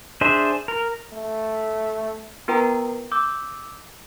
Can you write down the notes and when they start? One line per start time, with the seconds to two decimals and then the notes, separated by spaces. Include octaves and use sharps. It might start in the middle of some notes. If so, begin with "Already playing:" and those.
0.21 D4 G#4 C5 E5
0.68 A#4
1.13 A3
2.48 B3 F4 A#4 B4 G5 A#5
3.12 D6 E6 G6